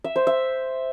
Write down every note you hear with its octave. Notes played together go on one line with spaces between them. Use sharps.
E5
C5
E5